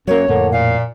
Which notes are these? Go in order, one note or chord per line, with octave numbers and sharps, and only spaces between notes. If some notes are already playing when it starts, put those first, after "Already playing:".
F#2 F#3 A#3 C#5
F2 A2 D3 A#3
A#2 F5